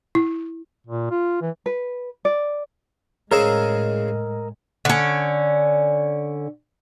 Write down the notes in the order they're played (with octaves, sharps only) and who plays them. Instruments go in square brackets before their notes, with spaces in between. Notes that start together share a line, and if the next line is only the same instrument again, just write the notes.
[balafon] E4
[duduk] A#2
F4
E3
[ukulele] B4
D5
[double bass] A2 G#3 [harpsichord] C#3 G#4 C5 [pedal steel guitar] A#4 D#5 E6
[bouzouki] D3 C#4